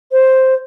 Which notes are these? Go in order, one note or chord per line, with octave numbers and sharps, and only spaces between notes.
C5